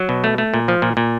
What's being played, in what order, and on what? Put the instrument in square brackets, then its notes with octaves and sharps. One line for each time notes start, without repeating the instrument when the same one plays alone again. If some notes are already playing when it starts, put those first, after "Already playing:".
Already playing: [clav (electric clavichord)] F#3
B2
A3
A3
A#2
F3
A#2
A#2